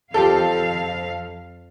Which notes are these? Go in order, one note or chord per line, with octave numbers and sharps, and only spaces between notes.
F2 F4 G4 A4 F5 G6